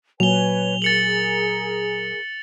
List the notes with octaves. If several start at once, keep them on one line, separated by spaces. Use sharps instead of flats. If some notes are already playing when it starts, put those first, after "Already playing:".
A#2 F#3 B4 C#5 G#5 F7 G7
G#4 A#4 A6 C#7 F#7